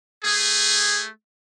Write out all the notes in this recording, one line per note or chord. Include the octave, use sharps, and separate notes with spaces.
A3 G#4